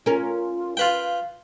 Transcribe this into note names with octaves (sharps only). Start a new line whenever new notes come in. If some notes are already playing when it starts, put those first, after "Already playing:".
C#4 F4 A#4
F4 B4 F5 G5